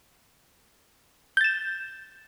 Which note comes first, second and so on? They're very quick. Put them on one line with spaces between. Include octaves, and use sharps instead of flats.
G6 A6 E7